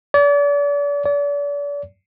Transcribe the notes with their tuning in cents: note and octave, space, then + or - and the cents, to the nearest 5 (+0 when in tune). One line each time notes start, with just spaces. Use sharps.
D5 -40
D5 -40